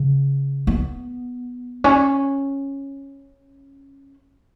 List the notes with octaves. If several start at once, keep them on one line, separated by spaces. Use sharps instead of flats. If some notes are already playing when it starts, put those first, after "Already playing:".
Already playing: C#3
B3
C#4